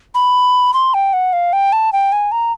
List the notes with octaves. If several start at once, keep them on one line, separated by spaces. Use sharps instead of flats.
B5
C6
G5
F#5
F5
G5
A5
G5
G#5
A#5